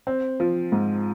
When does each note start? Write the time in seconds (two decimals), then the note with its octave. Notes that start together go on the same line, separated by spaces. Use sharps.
0.07 C4
0.40 F3
0.72 G#2